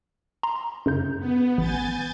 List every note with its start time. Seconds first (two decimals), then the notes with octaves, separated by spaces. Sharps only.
0.43 A#5 C6
0.86 F#2 C#3 G6
1.19 B3
1.58 A1 G#5 G6 A6